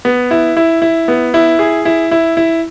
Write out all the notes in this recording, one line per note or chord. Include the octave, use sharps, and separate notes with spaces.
B3
E4
E4
E4
B3
E4
G#4
E4
E4
E4